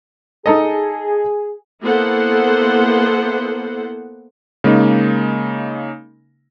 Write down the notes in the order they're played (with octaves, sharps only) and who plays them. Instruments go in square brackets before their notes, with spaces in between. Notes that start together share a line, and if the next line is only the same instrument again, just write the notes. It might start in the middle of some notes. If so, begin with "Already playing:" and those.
[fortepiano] D#4 A4 D#5 [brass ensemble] G#4
[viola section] A#3 B3 E4 A4 C5 F#5
[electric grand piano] C#3 G#3 A#3 D#4